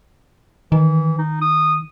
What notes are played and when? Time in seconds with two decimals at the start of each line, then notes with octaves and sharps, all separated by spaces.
0.72 D#3 E3
1.18 D#4
1.42 D#6